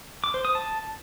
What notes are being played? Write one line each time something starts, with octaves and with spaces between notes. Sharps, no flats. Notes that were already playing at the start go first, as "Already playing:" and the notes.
D6
C5
D#6
A5